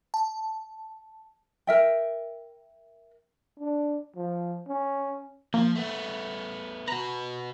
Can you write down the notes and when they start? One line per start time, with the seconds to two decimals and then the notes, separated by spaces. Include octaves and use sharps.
0.14 A5
1.67 A#4 E5 G5
3.60 D4
4.16 F3
4.68 C#4
5.54 F3 A#3
5.75 A3 B3
6.88 F#4 B4 A#5